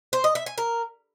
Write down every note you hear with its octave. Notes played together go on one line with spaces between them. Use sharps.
C5
D#5
E5
G#5
A#4